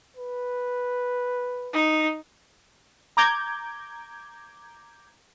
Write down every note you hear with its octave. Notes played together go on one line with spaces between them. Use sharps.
B4
D#4
A#5 D6 G6 G#6